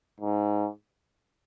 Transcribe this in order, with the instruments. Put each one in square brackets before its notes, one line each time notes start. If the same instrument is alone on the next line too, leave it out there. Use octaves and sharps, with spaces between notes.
[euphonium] G#2